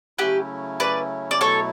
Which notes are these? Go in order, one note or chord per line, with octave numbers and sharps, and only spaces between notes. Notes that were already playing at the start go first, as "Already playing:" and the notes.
C#3 F#3 A3 C#4 E4 G4 B4
B4 D5
D5
B2 F#3 A3 E4 A4 C#5